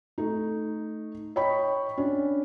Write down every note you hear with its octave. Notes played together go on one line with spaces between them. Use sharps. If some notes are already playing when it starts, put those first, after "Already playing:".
A3 D#4
C#5 D#5 G5 B5 C#6
C#4 D4